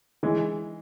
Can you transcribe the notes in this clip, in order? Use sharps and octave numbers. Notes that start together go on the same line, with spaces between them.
E3 G#3